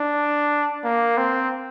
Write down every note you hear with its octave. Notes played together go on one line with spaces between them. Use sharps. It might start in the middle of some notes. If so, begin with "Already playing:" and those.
Already playing: D4
A#3
C4